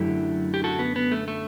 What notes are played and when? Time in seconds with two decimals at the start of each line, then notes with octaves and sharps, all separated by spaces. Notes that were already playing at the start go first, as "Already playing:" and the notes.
Already playing: F#2 D3 F#3 A3 E4 G4
0.54 G4
0.64 F#4 A4
0.79 B3
0.96 B3
1.12 A3
1.28 A3